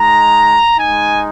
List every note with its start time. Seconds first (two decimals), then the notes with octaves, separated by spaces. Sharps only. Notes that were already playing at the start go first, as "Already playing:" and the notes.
Already playing: G#3 D#4 A#5
0.76 G#3 D#4 G#5